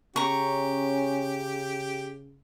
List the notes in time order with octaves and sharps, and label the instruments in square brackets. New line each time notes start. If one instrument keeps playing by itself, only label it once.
[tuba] C#3 [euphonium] C#4 [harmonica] G4 [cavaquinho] A#5 C#6